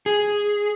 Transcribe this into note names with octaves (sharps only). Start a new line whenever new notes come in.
G#4